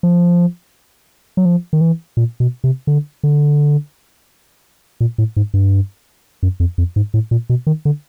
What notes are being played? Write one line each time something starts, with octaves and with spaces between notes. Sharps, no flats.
F3
F#3
F3
D#3
E3
A#2
B2
C3
D3
D3
A#2
A2
G#2
G2
F#2
F2
F2
G#2
A2
A#2
B2
D#3
D3